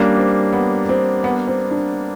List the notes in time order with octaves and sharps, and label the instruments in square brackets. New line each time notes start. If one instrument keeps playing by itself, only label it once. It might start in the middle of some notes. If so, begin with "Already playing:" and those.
Already playing: [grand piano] G3 A#3 D4 [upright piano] C#4
[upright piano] C4
B3
C4
B3
C4
D4